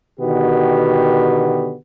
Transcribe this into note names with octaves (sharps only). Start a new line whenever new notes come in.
B2 D3 D#3 B3 F#4 G4